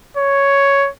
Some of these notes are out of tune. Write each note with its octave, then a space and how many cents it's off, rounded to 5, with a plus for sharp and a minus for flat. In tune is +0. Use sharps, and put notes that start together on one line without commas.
C#5 +5